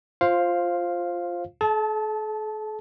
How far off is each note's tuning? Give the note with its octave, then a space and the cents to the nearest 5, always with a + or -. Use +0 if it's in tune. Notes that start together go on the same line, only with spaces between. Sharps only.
F4 +0 C5 +15 F5 +0
A4 -45 A5 -15